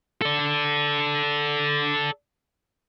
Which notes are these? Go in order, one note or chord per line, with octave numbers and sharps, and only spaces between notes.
A4 D5